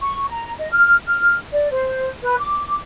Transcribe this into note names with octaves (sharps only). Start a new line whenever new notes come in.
C#6
A#5
D#5
F6
F6
D5
C5
B4
D6